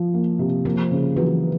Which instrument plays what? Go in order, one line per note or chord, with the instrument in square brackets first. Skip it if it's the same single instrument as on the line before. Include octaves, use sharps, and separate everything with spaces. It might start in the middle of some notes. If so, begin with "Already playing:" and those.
Already playing: [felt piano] F3
A#3
C3
[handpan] F3 [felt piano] A#3
[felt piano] C#3
[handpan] E3 [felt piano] F#3